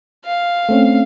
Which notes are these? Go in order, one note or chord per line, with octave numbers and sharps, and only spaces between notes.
F5
A3 C4 C#4